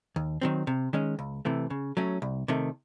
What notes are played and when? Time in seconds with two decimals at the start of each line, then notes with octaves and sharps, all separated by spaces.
0.16 D#2
0.41 D#3 F#3 C4
0.67 C3
0.93 D#3 G#3 C#4
1.19 C#2
1.45 C3 E3 A3
1.70 C#3
1.97 F#3 A3 C#4
2.22 C2
2.48 C3 D#3 A3